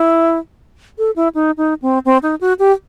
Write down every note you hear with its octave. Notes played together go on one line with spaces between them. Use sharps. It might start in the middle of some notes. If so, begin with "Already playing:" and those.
Already playing: E4
A4
E4
D#4
D#4
C4
C4
D#4
F#4
G4